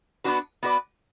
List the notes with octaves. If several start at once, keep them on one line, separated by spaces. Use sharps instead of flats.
B3 D4 F#4 B4
B3 F#4 B4 D5